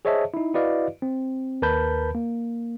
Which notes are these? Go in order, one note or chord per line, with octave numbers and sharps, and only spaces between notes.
G#4 C5 C#5 D#5 E5 A5
D#4 E4
E4 F#4 B4 D5 D#5 F5
C4
D#2 A#4 B4 A5 B5 G6
A#3